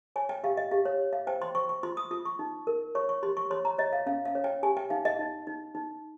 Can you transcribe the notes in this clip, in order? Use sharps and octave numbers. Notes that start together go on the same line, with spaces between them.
C#5 G#5
G5
G4 F5
D#5
G4 F5
C#5
C#5
F5
C5 G5
C6
C5 C#6
C#6
F4 C6
D#6
F4 D#6
C#6
D#4
A#4
C#5 C#6
C#6
G4 C6
C#6
C#5 C6
A#5
C#5 D#5
F5
C#4 F5
F5
C#5
G5
G4 G#5
G5
D#4 F5
D#5
D#4
D#4
D#4